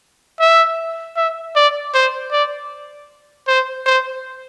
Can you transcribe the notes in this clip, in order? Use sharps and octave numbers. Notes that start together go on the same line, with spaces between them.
E5
E5
D5
C5
D5
C5
C5